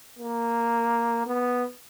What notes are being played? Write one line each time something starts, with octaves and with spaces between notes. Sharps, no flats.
A#3
B3